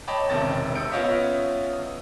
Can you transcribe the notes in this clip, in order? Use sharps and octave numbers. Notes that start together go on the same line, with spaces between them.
C#5 D#5 G5 A5 B5 D6
E1 A1 C3 D#3 A5 A6
D#6 E6 G6 C#7 D7
B3 C#4 F4 C#5 D#5 E5
D#6